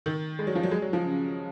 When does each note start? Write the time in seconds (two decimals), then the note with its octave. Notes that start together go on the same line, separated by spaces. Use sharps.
0.06 D#3
0.39 G#3
0.47 F#3
0.55 F3
0.63 F#3
0.71 G#3
0.82 F#3
0.93 F3
1.04 C#3